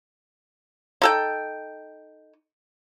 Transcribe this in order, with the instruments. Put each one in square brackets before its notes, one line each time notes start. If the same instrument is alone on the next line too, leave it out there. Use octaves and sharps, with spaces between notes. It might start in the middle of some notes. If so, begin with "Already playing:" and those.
[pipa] D#4 A4 G5